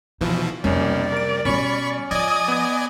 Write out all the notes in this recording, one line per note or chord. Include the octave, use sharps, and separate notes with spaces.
B2 E3 F3 D#4
B1 F2 C3 G3 A#3 C#4 D5
A#4 D7
B2 G3 C#4 B5 C#6
F3 D5 D#5 G#5 D#6
B3 G#6